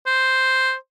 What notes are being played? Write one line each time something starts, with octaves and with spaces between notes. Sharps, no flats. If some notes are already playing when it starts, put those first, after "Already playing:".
C5